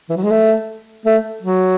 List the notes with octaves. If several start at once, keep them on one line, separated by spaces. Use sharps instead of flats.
E3
F#3
G#3
A3
A3
F#3